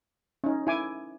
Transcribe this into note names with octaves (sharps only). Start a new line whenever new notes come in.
C#4 D#4
E4 G#5 D6